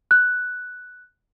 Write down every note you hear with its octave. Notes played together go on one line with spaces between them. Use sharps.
F#6